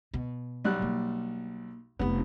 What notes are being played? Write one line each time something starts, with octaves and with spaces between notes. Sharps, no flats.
B2
B1 G3 F#6
A#3
F1 G3 B3